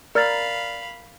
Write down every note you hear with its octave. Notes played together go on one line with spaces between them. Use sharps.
A#4 D5 F5 B5 F6 A6